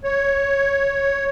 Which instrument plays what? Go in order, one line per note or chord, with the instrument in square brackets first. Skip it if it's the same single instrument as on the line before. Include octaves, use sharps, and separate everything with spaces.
[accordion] C#5